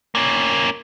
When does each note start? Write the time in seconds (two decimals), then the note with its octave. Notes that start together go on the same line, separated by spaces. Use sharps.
0.15 A#3 C#4